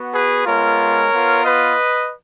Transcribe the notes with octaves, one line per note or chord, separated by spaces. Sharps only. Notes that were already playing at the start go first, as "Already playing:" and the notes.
Already playing: B3 F#4
G#4 B4
G#3 B3 F4 A#4 C#5
B3 F4
B4 D#5